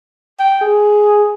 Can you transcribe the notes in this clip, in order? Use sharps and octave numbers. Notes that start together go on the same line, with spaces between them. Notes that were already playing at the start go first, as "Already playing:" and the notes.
G5
G#4